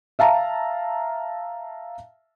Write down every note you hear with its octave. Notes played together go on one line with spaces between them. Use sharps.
E5 F5 A5 A#5